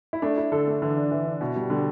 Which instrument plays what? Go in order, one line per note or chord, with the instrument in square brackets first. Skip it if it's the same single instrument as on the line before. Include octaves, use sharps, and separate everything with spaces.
[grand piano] E4
[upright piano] A3 [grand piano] D4
[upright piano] E4
[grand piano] D3 [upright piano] A4
[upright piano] A3
[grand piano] D3 [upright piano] E3
[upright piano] D4
E3
D4
[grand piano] B2 [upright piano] E4
[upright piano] G3
[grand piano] D3 [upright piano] G3